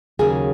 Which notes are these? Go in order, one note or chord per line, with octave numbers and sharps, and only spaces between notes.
D#2 C#3 F#3 A#3 G#4